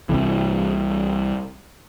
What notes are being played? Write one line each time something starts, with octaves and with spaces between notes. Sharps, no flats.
C2 C3 E3